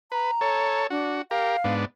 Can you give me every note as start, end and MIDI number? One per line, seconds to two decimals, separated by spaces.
0.12 0.31 71
0.12 0.83 82
0.41 0.87 69
0.41 0.87 73
0.90 1.20 62
0.90 1.22 66
1.31 1.57 67
1.31 1.57 70
1.31 1.74 77
1.64 1.85 44
1.64 1.85 59
1.64 1.85 62